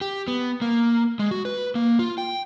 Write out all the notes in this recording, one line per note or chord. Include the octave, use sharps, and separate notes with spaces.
G4
B3
A#3
G#3
F#4
B4
A#3
F4
G5